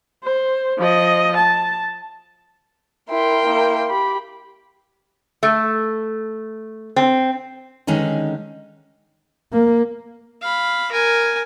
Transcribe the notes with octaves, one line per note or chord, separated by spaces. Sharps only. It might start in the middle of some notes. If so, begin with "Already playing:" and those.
C5
F3 D#5
A5
E4 A#4 G5 C6
A#3 E4
G4 B5
A3
C4
D3 D#3 G#3 C#4 D#4
A#3
F5 B5
A#4 G#5